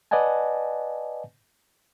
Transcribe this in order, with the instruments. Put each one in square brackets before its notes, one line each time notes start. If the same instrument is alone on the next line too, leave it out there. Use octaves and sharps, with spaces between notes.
[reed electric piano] B4 D5 D#5 F#5 G#5 A5